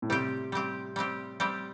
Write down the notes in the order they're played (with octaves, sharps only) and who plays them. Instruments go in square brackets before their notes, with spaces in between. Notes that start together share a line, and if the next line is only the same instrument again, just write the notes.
[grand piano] A2
[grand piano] C3 [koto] G3 C4 G4
[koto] G3 C4 G4
G3 C4 G4
G3 C4 G4